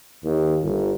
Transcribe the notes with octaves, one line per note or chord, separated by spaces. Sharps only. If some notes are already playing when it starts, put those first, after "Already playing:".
D#2
G1